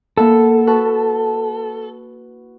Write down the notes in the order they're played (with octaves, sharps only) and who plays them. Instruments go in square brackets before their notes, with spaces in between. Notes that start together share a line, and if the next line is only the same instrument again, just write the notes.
[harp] A#3 E4 F#5 [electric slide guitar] A4
[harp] F#4 B4 A5